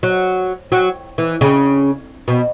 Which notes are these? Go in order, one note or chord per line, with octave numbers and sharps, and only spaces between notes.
F#3
F#3
E3
C#3
B2